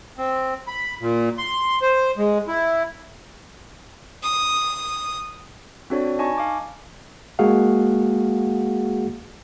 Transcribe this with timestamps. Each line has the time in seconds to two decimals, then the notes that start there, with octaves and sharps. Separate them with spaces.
0.18 C4
0.68 B5
1.01 A#2
1.38 C6
1.82 C5
2.17 G#3
2.48 E4
4.23 D#6
5.90 C4 D4 F#4 A4 C#5 D5
6.18 D#4 D#5 G#5 A5 C#6
6.38 F5 G#5 D6
7.39 G#3 A#3 F#4 G#4 F5 F#5